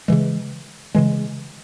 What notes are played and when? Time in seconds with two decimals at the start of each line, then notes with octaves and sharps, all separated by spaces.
0.08 C#3 E3 G#3
0.95 C#3 E3 G#3